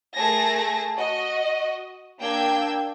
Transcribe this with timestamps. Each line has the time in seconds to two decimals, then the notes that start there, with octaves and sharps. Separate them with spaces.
0.15 A3 G#4 A#4 A5 G#6 A#6
0.96 F#4 D#5
2.21 A#3 D4 G5 E6 G6 G#6